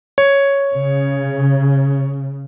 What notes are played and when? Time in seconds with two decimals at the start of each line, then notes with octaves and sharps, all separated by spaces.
0.18 C#5
0.75 C#3